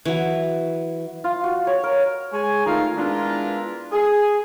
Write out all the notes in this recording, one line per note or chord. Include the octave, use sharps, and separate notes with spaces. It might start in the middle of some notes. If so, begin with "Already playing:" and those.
E3 F#3
F4
F#4
C#5
A#4
G#3 G#4 C#5 G#5
D#3 A3 D#4 F4 A#4 F5
G#3 B3 D4 E4 F4 A#4
G#4